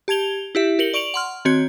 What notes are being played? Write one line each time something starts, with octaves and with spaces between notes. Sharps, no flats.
G4 A5 G#6 F7 G7
E4 G4 E5
G4 A#4 C#7 F#7 G7
D5 C#6 D7 F7 F#7
F#5 C6 F6
D#3 C4 F#4 C#5 G#6